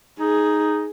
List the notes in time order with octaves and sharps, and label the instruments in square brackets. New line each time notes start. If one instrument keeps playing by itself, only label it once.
[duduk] D#4 [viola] G#4